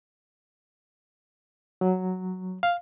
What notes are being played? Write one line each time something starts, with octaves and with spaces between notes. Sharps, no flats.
F#3
F5